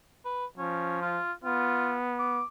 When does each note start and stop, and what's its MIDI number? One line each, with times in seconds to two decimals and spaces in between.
0.25 0.45 71
0.58 1.20 53
0.58 1.01 61
1.02 1.32 65
1.44 2.42 59
1.44 1.94 65
2.18 2.45 86